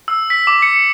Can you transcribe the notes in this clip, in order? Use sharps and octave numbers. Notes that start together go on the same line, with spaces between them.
E6
B6
D6
C#7